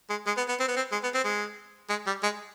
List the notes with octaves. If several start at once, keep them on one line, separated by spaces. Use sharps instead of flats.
G#3
G#3
B3
B3
C4
B3
C4
G#3
B3
C4
G#3
G#3
G3
G#3